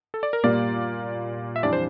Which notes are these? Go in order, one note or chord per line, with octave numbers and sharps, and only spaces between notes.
A4
D5
A#4
A#2 G3 A#3 D5
E5
F2 E3 G3 D4 D5
C5